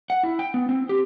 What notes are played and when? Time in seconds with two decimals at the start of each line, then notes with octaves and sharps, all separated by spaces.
0.10 F#5
0.23 E4
0.39 G5
0.54 B3
0.69 C4
0.89 G4